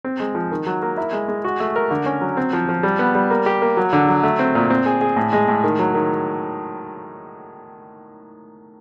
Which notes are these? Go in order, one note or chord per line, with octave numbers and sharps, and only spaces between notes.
C4
G#3
F3
D#3
F#3
A#3
E4
G#3
G#3
F#4
A3
A#4
D3
C#4
F#3
C4
F3
F3
G3
B3
G3
A#3
G4
A#3
F#3
D3
F#3
A3
C4
A#2
C4
G#4
G#4
A2
G#3
A2
D#3
F#3
D#3